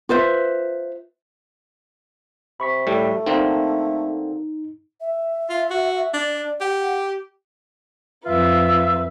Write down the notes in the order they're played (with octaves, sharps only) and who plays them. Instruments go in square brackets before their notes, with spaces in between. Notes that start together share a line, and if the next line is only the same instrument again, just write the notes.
[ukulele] F4 B4 C5 E5
[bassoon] C3 [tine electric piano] B5 C#6 B6
[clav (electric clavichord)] A2 G3 [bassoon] A3
[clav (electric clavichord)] D3 A#3 C4 [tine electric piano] D#4
[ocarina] E5
[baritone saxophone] F4
F#4
[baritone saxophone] D4 [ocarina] D5
[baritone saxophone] G4 [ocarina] F#5
[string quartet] F2 B4 [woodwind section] F4 [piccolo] E5